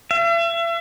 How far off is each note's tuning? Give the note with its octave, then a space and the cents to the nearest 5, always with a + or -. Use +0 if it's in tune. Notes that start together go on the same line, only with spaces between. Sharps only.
E5 +40